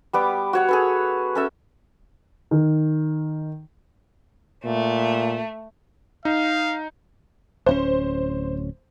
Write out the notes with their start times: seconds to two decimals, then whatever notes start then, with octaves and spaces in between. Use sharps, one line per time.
0.13 G3 B3 D6
0.53 F#4 C#5 F#5
0.69 G#4 A4 B4
1.35 C#4 A4 E5
2.51 D#3
4.65 A#2 A3
6.25 D#4 F5
7.66 D1 C4 C#4 C5